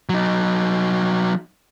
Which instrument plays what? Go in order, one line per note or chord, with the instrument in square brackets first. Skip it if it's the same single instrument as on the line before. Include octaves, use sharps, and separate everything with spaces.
[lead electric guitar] F#3 D#4